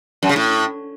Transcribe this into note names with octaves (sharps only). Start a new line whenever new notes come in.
F#2
C#3
A2